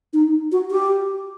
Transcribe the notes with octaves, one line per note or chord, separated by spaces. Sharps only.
D#4
F#4
G4